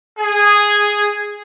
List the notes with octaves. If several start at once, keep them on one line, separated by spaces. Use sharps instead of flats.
G#4